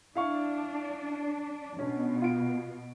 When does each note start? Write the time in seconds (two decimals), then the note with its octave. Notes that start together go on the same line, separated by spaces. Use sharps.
0.15 D4 E4 F5 C#6
1.79 B2 C#4 D4
2.22 F4 D7